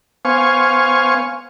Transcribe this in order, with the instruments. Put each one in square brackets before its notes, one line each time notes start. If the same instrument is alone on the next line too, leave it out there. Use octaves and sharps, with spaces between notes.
[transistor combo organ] B3 C5 F5 G#5 C#6